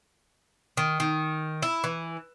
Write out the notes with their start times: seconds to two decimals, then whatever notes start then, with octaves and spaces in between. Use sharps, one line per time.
0.77 D#3
1.00 D#3
1.62 E4
1.84 E3